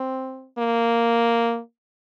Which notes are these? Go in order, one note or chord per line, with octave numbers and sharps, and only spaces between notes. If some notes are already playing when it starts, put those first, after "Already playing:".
Already playing: C4
A#3